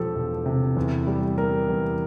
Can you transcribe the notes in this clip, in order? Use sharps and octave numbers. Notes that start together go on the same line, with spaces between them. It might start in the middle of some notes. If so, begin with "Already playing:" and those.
Already playing: E1 F3 G4 A4
E1
C3
E2
G3
G3 A#4
E2